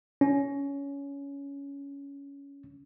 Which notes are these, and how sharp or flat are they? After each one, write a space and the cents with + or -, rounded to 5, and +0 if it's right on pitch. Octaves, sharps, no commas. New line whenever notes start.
C#4 +15